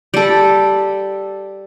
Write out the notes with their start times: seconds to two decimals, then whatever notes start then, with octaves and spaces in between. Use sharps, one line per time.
0.14 G3 A4